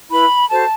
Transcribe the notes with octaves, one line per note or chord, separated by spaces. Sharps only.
E4 B4 B5
F#4 A4 C5 A5